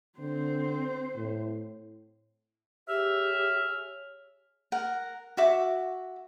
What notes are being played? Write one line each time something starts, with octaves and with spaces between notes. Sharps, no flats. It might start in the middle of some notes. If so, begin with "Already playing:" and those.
D3 C4 C5
A2
G4 G#4 C#5 E5 F6
A#4 F#5
F#4 E5 D6